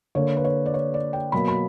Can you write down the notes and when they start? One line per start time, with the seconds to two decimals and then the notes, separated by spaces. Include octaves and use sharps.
0.15 D3 A#3 C#5
0.37 B4
0.44 C#5
0.66 D5
0.74 C#5
0.94 D5
1.13 G5
1.32 B2 F#3 A#3 B5
1.48 B5